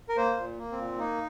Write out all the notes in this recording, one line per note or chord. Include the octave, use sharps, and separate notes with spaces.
A#4
A#3 C5
A#2
A#3
C4
A#2
A#3 D#4